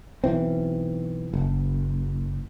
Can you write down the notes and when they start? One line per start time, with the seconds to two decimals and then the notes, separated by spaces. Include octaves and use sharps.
0.24 B1 E3 C4
1.34 F#1